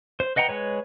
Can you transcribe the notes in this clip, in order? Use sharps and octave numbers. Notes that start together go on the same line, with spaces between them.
C5
B4 D#5 F#5 G5 A#5
G#3 B4 C#5